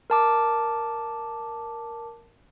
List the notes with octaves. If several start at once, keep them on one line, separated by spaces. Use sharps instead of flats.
A#4 A5 D6